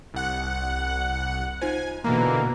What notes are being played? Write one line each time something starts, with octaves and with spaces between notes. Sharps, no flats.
C2 F#5
D#4 F4 C5 G#5
B2 D3 E3 A#3 A#5